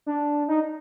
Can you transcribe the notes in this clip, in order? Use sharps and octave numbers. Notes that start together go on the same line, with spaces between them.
D4
D#4